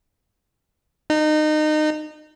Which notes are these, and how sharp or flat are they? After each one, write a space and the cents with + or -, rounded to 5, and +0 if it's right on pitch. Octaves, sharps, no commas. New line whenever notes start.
D#4 -25